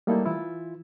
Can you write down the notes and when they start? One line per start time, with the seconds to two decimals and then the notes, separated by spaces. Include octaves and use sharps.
0.07 G3 A3 A#3 D#4 E4 A4
0.25 E3 E4 F4